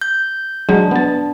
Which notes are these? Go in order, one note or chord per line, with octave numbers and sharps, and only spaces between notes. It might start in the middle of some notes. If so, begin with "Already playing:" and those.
G6
F#3 G#3 D4
B3 A5